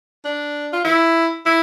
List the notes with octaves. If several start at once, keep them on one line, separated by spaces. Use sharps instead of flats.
D4
F4
E4
E4